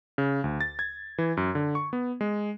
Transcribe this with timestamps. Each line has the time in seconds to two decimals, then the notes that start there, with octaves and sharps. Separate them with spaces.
0.18 C#3
0.44 D2
0.61 A6
0.79 G#6
1.18 E3
1.37 F#2
1.55 D3
1.75 C#6
1.93 B3
2.21 G#3